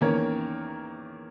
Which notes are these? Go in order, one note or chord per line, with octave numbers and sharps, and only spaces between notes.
E2 D#3 A#3 C#4 A#4 C#5